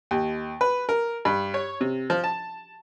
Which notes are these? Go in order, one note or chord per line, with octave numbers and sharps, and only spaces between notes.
D#2
B4
A#4
G2
C#5
C3
F3
A5